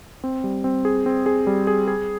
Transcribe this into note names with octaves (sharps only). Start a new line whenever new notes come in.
C4
G3
C4
G#4
C4
G#4
G3
G#4
G#4